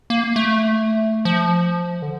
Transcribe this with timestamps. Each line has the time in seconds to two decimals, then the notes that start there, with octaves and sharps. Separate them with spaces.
0.10 A#3
0.36 A3
1.25 F3
2.02 D3